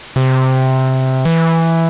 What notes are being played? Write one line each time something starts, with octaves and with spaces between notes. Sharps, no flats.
C3
E3